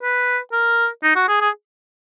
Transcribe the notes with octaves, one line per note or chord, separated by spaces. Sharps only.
B4
A#4
D#4
F#4
G#4
G#4